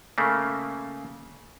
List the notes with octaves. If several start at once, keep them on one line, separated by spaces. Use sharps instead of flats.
C#3 A3 A#3